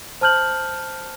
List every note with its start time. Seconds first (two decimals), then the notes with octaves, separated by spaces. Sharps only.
0.21 C5 A5 F6 G6 F#7